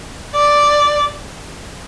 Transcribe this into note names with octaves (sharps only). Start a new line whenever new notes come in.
D5